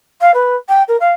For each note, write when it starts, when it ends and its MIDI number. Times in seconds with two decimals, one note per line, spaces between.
0.21 0.32 77
0.34 0.55 71
0.69 0.83 79
0.88 0.97 70
1.00 1.12 77